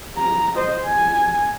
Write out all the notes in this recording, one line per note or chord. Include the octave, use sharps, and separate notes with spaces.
A#5
C5 D#5
G#5